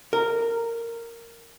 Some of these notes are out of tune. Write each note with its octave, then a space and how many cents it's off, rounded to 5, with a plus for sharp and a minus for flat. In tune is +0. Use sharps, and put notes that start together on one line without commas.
A#4 -10